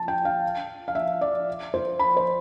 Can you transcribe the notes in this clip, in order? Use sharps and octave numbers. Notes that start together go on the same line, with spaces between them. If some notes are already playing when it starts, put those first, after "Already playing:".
Already playing: A5
G5
F5
F5
E5
D5
C5
B5
C5